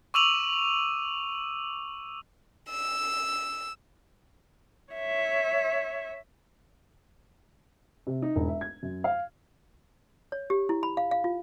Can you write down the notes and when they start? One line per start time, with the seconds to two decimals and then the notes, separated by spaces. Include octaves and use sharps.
0.14 C#6 D6 E6 D#7 F7 F#7
2.69 E6
4.93 C#5 E5
8.07 C3
8.22 D#4
8.36 E1
8.48 E5
8.61 G#6
8.83 F#2
9.04 F5
10.32 C#5
10.50 G4
10.69 E4
10.83 B5
10.97 F5
11.11 F5
11.24 F4